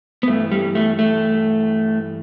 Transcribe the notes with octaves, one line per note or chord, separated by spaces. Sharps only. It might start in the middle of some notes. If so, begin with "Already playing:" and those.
B3
G2 E3 A3
G3
A3
A3